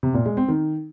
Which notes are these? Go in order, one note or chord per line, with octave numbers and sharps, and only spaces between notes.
C3
A#2
G#3
C4
D#3